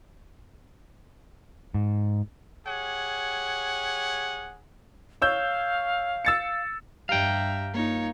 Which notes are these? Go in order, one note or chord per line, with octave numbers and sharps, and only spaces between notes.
G#2
G4 G#4 C#5 F#5
C#5 F5 E6 G6
E6 A6 C#7
G2 G4 E5 F5 G5 A#5
A#3 D#4 F4 C#5